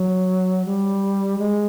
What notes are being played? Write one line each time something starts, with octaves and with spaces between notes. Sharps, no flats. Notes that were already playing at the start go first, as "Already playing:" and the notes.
Already playing: F#3
G3
G#3